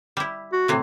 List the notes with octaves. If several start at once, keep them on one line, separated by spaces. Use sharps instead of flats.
G3 E4
F#4
A2 C3 E3